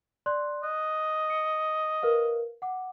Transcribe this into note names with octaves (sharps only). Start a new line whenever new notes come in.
D5 C6 F#6
D#5 F#6
C#7
A#4 B4 F5
F#5 D6